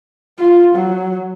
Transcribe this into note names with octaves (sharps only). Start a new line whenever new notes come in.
F4
F#3